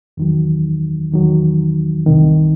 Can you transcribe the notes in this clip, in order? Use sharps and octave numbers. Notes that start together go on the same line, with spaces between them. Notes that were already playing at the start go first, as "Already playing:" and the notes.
E2 D#3 F#3
E2 D#3 F#3
C2 C3 D#3